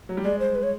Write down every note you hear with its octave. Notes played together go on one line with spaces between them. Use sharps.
F#3
G3
G#3 D5
C5
B4
C#5